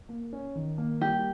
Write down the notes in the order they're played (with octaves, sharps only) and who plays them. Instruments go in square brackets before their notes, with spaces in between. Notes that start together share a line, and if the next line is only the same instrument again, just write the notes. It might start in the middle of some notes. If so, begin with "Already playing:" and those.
[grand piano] A#3
C#4
D#3
A#3
[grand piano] G3 [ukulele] G4